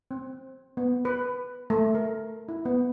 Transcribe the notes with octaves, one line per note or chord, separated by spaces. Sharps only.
C4
B3
B4
A3
A#4
E4
B3